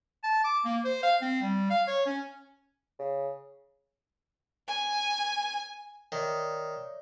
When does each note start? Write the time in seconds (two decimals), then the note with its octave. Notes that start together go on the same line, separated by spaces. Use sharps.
0.23 A5
0.44 D6
0.65 A#3
0.85 C5
1.03 F5
1.22 C4
1.42 G3
1.70 F5
1.87 C#5
2.06 C#4
2.99 C#3
4.68 G#5
6.12 D#3 C#5 D5 E5